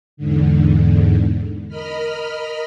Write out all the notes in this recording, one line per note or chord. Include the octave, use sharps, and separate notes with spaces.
E2 G#2 D3
A#4 D#5 B5 F6